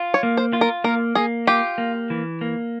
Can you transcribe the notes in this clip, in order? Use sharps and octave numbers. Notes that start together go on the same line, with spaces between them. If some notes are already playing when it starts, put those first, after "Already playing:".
Already playing: F4
C#5
A#3
C5
F4
A#4
A#3 A#4
A#3 G#4
F4 G4
A#3
E3
A#3